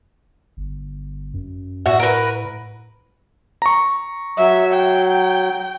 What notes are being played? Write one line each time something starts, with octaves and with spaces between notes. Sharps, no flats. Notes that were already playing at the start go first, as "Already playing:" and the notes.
G1
F#2
A2 F#4 E5
A#4 B4
A#5 C#6
F#3 E5
G5